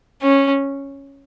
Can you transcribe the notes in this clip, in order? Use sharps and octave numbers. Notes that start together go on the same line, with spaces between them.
C#4